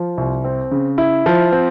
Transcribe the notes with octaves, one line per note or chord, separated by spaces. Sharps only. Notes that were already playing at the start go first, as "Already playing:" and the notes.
Already playing: F3
C2
C4
C#3
E4
F3
C4